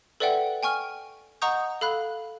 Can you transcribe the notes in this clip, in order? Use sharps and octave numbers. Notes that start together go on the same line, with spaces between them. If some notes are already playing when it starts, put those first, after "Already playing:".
A4 B4 D5 E5 F#5 G5
G5 G#5 C#6 F6
D#5 F#5 A#5 C#6 D#6 G6
A4 F5 B5 F#6